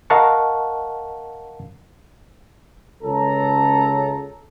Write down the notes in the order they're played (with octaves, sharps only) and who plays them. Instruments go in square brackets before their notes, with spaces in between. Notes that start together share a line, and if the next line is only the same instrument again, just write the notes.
[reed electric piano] A#4 D#5 F5 F#5 A5 C#6
[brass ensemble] C#2 A4 A#5